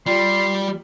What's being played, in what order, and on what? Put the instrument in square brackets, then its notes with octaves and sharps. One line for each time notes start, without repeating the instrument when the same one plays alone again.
[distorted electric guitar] G3 [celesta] F4 D5 G5 [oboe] C6